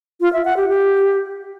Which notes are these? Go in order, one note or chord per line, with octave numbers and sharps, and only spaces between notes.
F4
E5
F#5
G4
G4